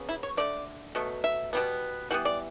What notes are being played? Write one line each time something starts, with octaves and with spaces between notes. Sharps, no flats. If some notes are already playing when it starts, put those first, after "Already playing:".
Already playing: C#3 F#3 B3
E4
C#5
D3 A3 D5
B2 F#3 A3
E5
B2 G3 B3
E3 G3 B3 F#5
D5